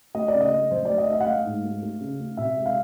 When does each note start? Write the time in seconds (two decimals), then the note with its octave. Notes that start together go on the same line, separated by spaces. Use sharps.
0.15 A3 D#5
0.28 D5
0.34 C#3
0.41 D#5
0.52 A3
0.70 F#2 C5
0.85 A3 D5
0.98 D#5
1.09 A3 D#5 E5
1.21 F#5
1.26 A3 F5
1.45 G#2
1.64 A3
1.82 A3
2.01 C#3
2.19 A3
2.37 C3 E5
2.57 G#3
2.66 F5